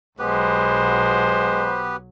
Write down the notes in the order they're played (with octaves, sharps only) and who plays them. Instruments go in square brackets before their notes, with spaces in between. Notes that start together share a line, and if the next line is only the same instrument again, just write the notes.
[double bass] B1 F#3 [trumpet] G#3 [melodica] B3 G4 B4 [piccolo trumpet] C5